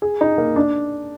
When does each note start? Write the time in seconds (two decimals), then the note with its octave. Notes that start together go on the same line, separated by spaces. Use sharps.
0.02 G#4
0.21 D#4
0.38 A#3
0.56 D4